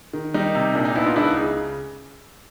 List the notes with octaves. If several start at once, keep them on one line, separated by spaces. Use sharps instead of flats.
D#3
G3 D#4
C3
A#2 D4
D#4
B3 D4 E4
D#4 F4
C#2 D4 E4
D#4
C#3